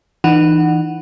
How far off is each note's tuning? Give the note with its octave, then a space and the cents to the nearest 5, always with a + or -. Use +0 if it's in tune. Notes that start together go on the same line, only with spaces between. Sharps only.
E3 +0 D#4 -35 F#5 +5